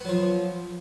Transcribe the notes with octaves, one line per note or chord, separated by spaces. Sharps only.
F3 F#3 B3